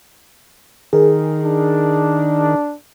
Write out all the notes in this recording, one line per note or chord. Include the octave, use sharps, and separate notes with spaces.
D#3 G#4 A#4
D4